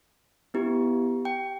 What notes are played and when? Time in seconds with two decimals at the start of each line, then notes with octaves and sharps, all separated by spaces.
0.54 B3 E4 G4
1.25 G5